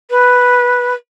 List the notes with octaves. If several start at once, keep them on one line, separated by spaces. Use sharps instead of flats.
B4